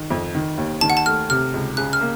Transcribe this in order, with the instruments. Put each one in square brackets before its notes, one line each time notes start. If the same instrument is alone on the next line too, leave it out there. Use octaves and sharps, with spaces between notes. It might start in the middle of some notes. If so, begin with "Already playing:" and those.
Already playing: [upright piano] D#3
F2
D#3
D#2
[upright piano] D#3 [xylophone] A5
[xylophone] F#5
A5
[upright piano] A3 [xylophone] F6
[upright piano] C3 [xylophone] F6
[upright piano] C#2
[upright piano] C#3 [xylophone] F#6
[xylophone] F6
[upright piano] A#3